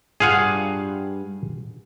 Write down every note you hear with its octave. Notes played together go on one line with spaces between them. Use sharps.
G2 F4 G#4 F5 F#5